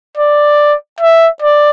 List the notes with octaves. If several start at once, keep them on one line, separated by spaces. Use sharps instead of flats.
D5
E5
D5